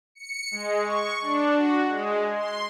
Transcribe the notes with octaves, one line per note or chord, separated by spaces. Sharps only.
C#7
G#3
C#6
D4
F#4
G#3
C6